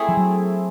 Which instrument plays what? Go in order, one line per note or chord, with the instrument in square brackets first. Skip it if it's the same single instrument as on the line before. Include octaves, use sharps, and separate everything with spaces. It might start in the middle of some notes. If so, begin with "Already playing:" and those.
Already playing: [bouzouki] A3 C4 E4 G#4
[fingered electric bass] F3
F#3